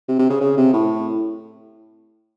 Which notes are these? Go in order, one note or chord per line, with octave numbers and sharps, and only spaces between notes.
C3
C3
C#3
C#3
C3
A2